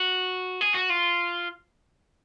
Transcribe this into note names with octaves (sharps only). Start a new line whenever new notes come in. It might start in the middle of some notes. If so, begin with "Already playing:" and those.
Already playing: F#4
G#4
F#4
F4